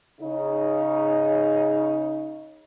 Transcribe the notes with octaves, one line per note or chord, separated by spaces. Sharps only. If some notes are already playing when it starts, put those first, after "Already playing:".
C#3 D#4